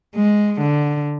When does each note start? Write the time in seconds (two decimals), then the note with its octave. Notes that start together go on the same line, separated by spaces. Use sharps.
0.16 G#3
0.61 D3